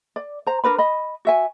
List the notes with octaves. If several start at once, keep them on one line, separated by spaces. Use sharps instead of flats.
D5
C5 A#5
D4 A#4 B4 B5
D#5 B5
F#4 E5 G#5